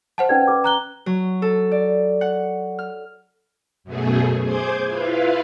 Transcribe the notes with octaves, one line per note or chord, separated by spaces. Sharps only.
C5 F#5 A5
C#4 B4 D5
B4 D6
A#5 F#6 G7
F#3
A4
D5
F#5
F6
F#2 B2 A3 G#4
G#4 C5 D6 G6 G#6
E4 F4 B4 F5